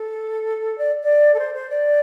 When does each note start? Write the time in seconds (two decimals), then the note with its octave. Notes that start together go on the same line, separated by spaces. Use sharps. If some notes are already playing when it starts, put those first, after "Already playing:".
Already playing: A4
0.78 D5
1.03 D5
1.34 A4
1.39 C5
1.54 C5
1.69 D5